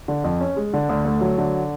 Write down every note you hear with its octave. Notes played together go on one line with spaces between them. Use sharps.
D3
F2
C#4
G#3
D3
D2
A3
F#3
D3